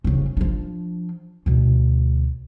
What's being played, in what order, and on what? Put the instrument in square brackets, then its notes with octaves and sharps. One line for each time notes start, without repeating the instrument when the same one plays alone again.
[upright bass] F1 C#3
F3 D4
D2 B2